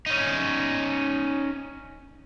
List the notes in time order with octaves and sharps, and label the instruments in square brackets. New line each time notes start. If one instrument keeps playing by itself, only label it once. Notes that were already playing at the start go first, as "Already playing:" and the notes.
[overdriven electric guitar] C#4 D#4